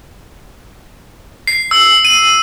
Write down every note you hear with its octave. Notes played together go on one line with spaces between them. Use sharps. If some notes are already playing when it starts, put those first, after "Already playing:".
C7
E6
D#7